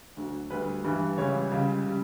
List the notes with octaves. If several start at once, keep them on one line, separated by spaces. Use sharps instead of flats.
D2 D3 F#3
D2 D3 G3 B4
G2 E3 G3
C#2 C#3 E3 G3 C#5
C#2 C#3 G3
C#3 G3